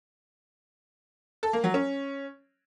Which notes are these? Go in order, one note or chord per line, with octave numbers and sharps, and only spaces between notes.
A4
A#3
F#3
C#4